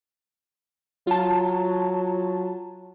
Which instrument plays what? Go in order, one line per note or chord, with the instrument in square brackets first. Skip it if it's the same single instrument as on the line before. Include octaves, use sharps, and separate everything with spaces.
[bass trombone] F#3 [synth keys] F4 A5